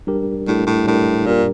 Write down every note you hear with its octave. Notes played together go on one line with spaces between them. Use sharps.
G3 D4 G4 A#4
A2 G3 D4 G4 A#4
A2
A2 G3 D4 G4 A#4
A#2 G3 D4 G4 A#4